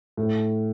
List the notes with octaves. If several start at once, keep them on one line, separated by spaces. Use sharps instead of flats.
A2